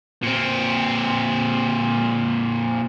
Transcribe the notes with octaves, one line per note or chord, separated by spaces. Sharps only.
A#2 C4